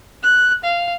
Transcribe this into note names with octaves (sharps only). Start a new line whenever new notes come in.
F#6
F5